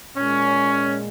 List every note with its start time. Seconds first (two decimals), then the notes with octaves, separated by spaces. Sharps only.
0.17 A#2 G#3 C#4